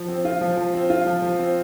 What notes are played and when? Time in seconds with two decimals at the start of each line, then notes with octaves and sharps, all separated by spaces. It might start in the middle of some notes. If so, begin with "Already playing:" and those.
Already playing: F3
0.08 C4
0.25 F4
0.41 F3
0.57 F3
0.74 C4
0.90 F4
1.06 F3
1.22 F3
1.39 C4